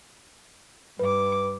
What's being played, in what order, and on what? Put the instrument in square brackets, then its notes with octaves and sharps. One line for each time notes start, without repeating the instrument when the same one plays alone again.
[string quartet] G2 D6 [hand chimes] B4